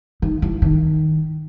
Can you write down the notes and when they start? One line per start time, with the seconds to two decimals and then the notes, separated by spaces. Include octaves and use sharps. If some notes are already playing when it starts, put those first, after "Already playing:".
0.22 D#3
0.42 E3
0.62 D#3